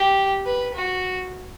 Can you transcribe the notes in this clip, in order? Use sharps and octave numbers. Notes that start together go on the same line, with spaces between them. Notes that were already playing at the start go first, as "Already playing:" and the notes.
Already playing: G4
B4
F#4